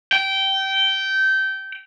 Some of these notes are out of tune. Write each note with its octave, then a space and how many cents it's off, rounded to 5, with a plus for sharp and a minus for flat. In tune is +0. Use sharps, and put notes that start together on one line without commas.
G5 -20